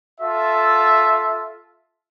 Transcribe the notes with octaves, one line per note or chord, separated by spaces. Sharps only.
F4 A4 E5